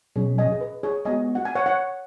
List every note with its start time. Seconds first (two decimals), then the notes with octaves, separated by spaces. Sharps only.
0.16 B2 F#3 C#4 G#4 C#5
0.38 D#5 G#5
0.52 G#4
0.61 B4
0.83 G#4 C#5
1.05 G#3 B3 F#4 D#5 G#5
1.35 F#5
1.45 G#5
1.55 C#5 F#5
1.66 C#5 F#5